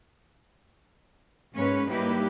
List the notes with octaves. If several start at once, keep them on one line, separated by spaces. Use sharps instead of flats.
G#2 G#3 A#3 C#4 B4 C#5
G3 A#3 D#4 E4 G4 B4